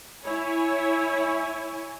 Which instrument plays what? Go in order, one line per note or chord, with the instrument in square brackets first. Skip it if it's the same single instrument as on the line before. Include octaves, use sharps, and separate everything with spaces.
[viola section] E4 C#5 G#5